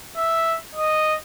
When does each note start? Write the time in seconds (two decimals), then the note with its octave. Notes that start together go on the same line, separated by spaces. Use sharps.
0.17 E5
0.75 D#5